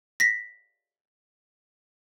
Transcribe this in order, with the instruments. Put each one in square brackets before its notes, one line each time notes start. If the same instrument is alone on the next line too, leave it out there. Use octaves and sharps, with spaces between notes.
[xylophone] A#6 B6